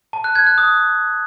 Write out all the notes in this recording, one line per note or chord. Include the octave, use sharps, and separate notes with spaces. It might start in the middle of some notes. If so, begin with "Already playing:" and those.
A5
F#6
G#6
F#6
D#6